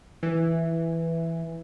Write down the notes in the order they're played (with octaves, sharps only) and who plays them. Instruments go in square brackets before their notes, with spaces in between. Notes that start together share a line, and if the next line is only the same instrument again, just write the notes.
[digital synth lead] E3